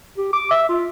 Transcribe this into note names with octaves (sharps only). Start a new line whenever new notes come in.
G4
D6
E5
F4